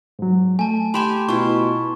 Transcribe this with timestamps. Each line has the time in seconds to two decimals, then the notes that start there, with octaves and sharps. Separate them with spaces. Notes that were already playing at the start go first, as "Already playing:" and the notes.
0.19 G#2 F#3
0.59 A3 G#5 A5
0.94 G4 G5 G#5 B5 C6 E7
1.29 B2 E4 F4 C#6